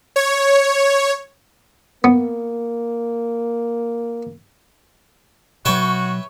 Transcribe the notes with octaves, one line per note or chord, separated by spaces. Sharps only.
C#5
A#3 B3
B2 F#3 F#4 B4 C#5 E5 G5